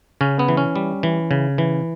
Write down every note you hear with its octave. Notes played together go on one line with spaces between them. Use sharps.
C#3 C#4
B3
E3
C#4
G3
E3
C#3
E3